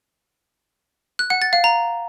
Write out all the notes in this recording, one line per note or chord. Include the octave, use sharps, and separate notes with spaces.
F#6
F#5
A6
F5
A#5